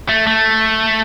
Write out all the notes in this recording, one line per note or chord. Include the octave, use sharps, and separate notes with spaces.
A3
A3